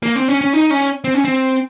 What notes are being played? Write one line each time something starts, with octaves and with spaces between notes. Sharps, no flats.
A#3
C4
C#4
C#4
D#4
C#4
C4
C#4
C4